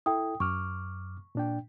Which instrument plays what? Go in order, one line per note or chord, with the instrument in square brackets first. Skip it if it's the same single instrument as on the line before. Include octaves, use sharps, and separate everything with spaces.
[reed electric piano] E4 A4 [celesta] G5 D#6
[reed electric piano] F#2 D6 F6 [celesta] C#6
[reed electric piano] A#2 D4 G5